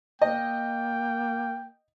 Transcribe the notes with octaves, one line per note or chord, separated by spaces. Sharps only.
A#3 D#5 G5